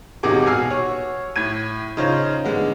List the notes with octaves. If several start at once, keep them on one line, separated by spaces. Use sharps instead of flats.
E1 C3 D#4 F#4 G#4 D6
B2 G#5 E6 F6 C7
F#4 C#5
A2 G#6 D#7
C#3 D#4 F4 C5 C#5
D3 G#3 B3